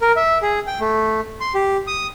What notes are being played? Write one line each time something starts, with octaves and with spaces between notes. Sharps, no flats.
A#4
E5
G#4
G5
A3
C6
G4
D#6